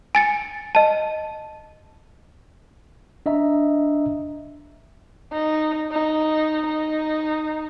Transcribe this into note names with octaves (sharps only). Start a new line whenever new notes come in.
G#5 A6 C#7
D#5 A5
D4 D#5 E5 A#5
D#4
D#4
D#4